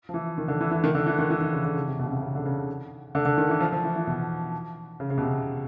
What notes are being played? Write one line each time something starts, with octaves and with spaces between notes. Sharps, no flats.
F3
E3
D#3
D3
E3
E3
D#3
D3
E3
D#3
E3
D#3
C#3
D3
C#3
C3
B2
C#3
C3
C#3
D3
C#3
D3
D3
D#3
E3
F3
F3
E3
E3
B2
C#3
C#3
B2
C3